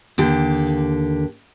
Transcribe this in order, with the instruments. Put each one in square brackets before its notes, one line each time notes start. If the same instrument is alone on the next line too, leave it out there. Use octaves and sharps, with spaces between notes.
[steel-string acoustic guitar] D#2 D3 G4